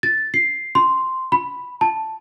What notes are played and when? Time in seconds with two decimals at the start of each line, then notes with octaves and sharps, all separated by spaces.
0.03 A6
0.34 C7
0.75 C6
1.32 B5
1.81 A5